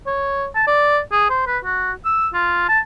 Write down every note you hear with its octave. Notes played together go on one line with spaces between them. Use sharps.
C#5
A5
D5
G#4
C5
B4
F#4
E6
F4
A5